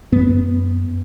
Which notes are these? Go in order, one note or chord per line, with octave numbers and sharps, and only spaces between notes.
F#2 B3